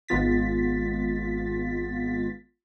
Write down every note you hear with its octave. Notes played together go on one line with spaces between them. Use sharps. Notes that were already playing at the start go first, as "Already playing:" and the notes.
G#1 G#3 B3 F4 A6 B6